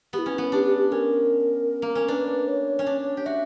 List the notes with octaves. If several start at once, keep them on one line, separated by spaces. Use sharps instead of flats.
B3 G4
E4
C#4
B3
D4 G4
G4
G4
C#4 A#4
A#3
C#4
D4 B4
C#5
C#4
D4
G4
F#4 E5